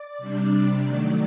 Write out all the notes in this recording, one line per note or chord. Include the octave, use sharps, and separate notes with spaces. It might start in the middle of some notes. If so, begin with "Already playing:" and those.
Already playing: D5
C3 G3 D4
D5
D#3 F#3 A3